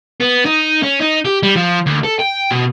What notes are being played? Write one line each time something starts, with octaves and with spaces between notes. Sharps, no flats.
B3
D#4
C#4
D#4
G4
G3
F3
D2
A4
G5
B2